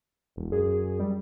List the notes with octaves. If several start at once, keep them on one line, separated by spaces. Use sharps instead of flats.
E1
F#2 G#4
G3